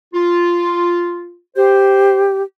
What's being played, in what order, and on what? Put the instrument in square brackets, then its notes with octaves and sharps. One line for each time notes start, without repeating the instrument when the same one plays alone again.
[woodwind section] F4
[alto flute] G4 [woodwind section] C5